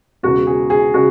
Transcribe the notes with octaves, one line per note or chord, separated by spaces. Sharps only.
E1 E2 C#3 F#4
G#4
G#4
C#3 F#4